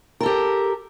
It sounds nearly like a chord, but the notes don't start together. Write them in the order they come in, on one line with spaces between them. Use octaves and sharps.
A#4 A4 G4